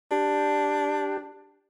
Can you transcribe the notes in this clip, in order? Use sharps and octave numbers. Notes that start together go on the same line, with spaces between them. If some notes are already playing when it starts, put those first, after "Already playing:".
D4 G4